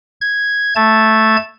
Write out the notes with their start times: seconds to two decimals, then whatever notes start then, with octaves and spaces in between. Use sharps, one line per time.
0.21 G#6
0.76 A3 A5 G#6